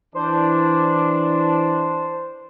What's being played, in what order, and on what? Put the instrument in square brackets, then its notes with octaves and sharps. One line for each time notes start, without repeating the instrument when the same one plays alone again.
[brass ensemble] E3 D4 [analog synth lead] C5